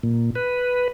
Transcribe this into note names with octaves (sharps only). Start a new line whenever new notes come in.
A#2
B4